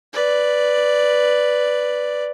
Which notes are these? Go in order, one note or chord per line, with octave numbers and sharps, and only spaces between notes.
B4 D5